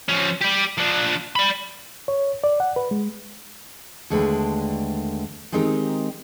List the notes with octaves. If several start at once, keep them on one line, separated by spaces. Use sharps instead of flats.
F3 C#4
G4 D5
F3 D4
D5 B5
C#5
D5
F#5
B4
G#3
D#2 D3 G#3 A3 B4 G5
D#3 G#3 C4 D#4 G4 A#4